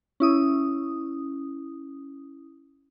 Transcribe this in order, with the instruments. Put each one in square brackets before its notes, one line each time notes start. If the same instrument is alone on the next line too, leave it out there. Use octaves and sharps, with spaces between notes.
[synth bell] C#4 E4 D#6